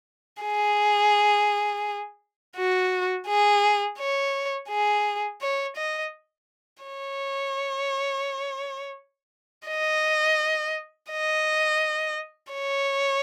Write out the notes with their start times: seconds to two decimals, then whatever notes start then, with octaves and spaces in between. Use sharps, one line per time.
0.43 G#4
2.56 F#4
3.28 G#4
3.99 C#5
4.70 G#4
5.41 C#5
5.77 D#5
6.84 C#5
9.68 D#5
11.11 D#5
12.53 C#5